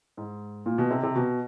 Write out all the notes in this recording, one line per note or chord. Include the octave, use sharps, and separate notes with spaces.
G#2
A#2
B2
C3
C3
B2